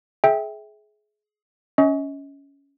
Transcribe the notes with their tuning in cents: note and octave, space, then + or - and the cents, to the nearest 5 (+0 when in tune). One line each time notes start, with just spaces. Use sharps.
G#4 +25 E5 -15 G5 +10
C#4 +15 D#5 +40 C#6 +25